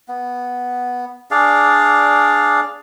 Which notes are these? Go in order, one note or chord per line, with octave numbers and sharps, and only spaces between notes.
B3
D4 G#4 D5 F5